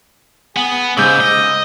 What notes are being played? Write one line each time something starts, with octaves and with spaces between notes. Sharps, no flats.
B3 G#4
G#2 C#3 D6 E6 G6
D#5